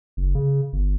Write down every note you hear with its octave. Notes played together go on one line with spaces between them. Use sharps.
F#1
C#3
G1